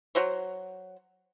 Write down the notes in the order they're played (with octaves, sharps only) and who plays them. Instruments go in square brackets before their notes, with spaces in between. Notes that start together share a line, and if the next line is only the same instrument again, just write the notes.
[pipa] F#3 F#4 C5 C#5